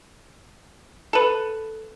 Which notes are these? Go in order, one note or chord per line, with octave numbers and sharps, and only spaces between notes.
A4 B4